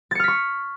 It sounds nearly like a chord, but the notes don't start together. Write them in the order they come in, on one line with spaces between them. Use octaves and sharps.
A6 C#7 F6 B6 C#6